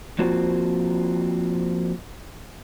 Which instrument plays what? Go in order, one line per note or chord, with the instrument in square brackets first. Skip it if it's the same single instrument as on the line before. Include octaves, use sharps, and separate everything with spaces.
[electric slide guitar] F3 A#3 C4 F4 F#4